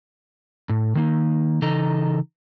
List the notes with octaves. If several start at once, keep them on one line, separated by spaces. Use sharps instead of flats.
A2
D#3 A#3 D#4
C#3 E3 D#4 A4 D#5 A#5